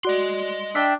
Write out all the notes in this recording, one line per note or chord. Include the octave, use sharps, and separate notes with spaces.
F#4 D5 D#5 C6
D4 E5 G5